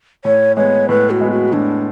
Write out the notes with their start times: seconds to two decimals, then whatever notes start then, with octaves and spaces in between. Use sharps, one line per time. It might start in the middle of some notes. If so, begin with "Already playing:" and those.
0.24 A2 C#5
0.56 G#3 B3 C#5
0.89 A2 B4
1.10 F#4
1.21 G#3 B3
1.31 F#4
1.53 A2 D4